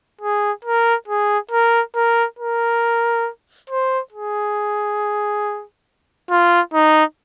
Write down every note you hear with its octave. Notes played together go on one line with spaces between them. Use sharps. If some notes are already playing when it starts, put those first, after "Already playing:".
G#4
A#4
G#4
A#4
A#4
A#4
C5
G#4
F4
D#4